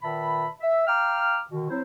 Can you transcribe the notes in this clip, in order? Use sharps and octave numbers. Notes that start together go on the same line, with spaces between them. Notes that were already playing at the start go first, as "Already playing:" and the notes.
A#2 D#3 B4 E5 A5 B5
E5
F5 G5 A#5 D6 F6
B2 D3 D#3
F#3 C4 E4 C5